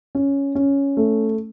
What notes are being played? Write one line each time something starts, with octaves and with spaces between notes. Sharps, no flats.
C#4
C#4
A3